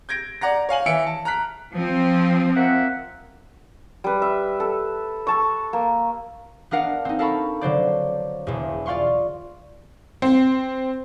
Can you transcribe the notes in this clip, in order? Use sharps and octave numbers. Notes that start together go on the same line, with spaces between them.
G6 G#6 A#6 D7
D5 F#5 A#5 A#6
C#5 F5 G#5 F#7
E3 E5 C#7 D7
A5
A#5 F6 F#6 B6
F3 C4
A#3 E5 F#5
G3 B4
E5
A4
A4 A5 C#6
A#3
B3 D4 A#4 F5 F#5
C4 D#4
A4 A#4 F5 A5 B5 C#6
D3 F#3 C5 D5
E1 E2
F4 D5 F5 C6 C#6
C4